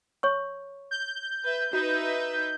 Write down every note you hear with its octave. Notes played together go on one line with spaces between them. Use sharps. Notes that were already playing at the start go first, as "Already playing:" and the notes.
C#5 C#6
G6
B4 E5
D#4 F#4 B4 E5